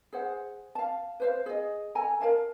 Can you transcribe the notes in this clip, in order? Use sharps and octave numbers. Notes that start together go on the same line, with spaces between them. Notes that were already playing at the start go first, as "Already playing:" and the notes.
G#4 C5 F#5
F5 A5
B4 C5 F5
G#4 D#5
A4 G#5 A#5
A#4 C#5 F5 A5